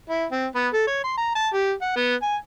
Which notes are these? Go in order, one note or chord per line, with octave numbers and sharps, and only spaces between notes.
E4
C4
B3
A4
C#5
C6
A#5
A5
G4
F#5
B3
G#5